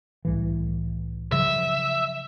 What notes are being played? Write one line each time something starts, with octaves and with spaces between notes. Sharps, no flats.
C2 A2 E3
C#3 F3 F#3 E5